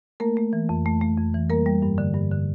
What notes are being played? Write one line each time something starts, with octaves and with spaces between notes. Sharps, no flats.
A3 A#3 A#4
A3
E3
F2
A3
A3
F2
E3
G3 A#3 A#4
G3
G2
D3
G2
D3